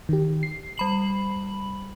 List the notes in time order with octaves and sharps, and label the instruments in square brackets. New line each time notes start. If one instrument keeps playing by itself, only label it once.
[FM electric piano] D#3 G4
C7
[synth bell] G3 B5 F#7